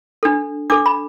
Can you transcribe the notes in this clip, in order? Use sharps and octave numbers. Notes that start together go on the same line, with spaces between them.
D4 A4
D4 A4 D6
B5